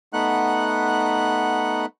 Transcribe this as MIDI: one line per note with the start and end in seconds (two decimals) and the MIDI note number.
0.13 1.86 57
0.13 1.86 59
0.13 1.86 63
0.13 1.86 78
0.13 1.86 90